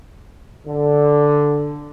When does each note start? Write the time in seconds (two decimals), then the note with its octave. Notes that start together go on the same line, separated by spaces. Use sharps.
0.67 D3